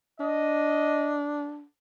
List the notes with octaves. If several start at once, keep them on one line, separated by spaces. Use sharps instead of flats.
D4 D#5